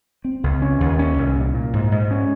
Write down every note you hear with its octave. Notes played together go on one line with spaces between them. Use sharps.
C4
C#2
C#4
D#2
C#4
C2
A#2
A#2
G#2
G#2
C#4